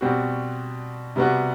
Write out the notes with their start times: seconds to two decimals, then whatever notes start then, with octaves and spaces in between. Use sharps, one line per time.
0.01 B2 G3 C4 F#4
1.16 C3 G3 B3 F#4